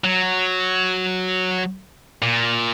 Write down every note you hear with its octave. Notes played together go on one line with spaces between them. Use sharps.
F#3
A#2